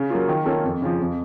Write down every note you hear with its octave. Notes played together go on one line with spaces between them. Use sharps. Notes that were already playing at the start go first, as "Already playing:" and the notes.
Already playing: C#3
F#3 A#3 F4
D#3
A#3 C#4 F4 A4
F2
C#3 F3
F2